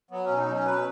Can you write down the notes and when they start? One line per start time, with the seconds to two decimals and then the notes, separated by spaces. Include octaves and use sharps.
0.11 F#3 B3
0.24 B2 C#4
0.38 D#4
0.48 F#3 C#4
0.65 B2 B4